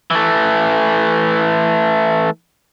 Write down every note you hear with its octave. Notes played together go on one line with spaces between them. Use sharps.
E3 A3